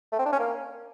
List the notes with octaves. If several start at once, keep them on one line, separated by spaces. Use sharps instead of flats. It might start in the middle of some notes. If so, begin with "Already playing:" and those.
A3
C4
D4
C#4
A#3